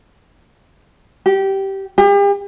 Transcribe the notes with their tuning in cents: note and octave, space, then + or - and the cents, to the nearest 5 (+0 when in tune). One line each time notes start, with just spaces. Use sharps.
G4 -15
G4 +40